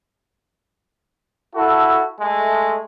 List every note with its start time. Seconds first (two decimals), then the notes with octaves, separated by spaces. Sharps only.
1.54 E4 F#4 A4
2.21 G#3 A3